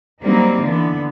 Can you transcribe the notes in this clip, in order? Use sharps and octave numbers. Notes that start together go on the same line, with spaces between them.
F#3 G3 A#3 C4 D#4
D3 E3 B3